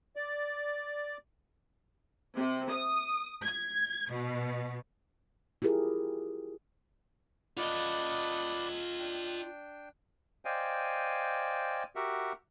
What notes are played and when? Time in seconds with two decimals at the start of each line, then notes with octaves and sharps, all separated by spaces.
0.16 D5
2.35 C3
2.70 D#6
3.45 G#6
4.12 B2
5.62 E4 F4 G4 G#4 A#4
7.57 F4 B4 D5 D#5 F#5
8.99 D4 G5
10.45 C5 D5 D#5 F5 G5 G#5
11.96 F#4 G4 A#4 E5 F#5